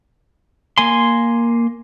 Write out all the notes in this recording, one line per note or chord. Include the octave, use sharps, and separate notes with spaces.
A#3 G#5 C6